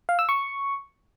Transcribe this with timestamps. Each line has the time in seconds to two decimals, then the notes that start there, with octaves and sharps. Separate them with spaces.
0.09 F5
0.19 E6
0.29 C#6